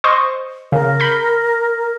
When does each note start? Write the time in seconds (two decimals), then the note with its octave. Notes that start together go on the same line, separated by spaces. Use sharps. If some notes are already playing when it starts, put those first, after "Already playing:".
0.04 C5 D#5 C#6
0.72 C#3 A#4
1.00 B5 G6